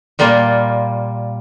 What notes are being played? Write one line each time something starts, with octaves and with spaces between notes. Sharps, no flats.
A#2 G3 A#3 F4